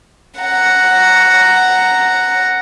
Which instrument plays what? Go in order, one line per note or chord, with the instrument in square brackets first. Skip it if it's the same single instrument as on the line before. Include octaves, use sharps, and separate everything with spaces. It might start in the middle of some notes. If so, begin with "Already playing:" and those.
[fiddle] F#5 A#5